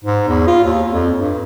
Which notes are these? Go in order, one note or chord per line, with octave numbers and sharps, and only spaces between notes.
G#2
E2
F4
D#2
F2
G2